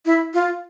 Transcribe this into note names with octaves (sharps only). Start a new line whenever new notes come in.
E4
F4